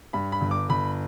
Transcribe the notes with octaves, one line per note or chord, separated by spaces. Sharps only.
G2 B5
B5
G1
D6
G1 B5